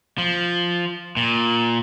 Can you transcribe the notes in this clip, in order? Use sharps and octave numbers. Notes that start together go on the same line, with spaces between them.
F3
A#2